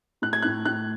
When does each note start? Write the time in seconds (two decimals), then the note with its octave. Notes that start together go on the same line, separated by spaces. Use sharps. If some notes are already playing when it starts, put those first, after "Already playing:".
0.22 A2 F#6
0.33 G#6
0.42 A2 F#6
0.65 A2 F#6